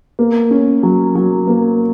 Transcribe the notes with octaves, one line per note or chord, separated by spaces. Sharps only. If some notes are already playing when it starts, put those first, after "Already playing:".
A#3
C#4
F#3
F#3
A#3